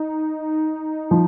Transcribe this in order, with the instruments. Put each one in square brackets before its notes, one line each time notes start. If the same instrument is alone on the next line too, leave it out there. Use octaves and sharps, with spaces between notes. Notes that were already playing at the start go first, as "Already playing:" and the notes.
Already playing: [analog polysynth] D#4
[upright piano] F3